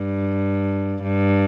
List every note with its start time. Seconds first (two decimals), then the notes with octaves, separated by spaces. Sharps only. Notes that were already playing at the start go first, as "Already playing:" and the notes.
Already playing: G2
1.03 G2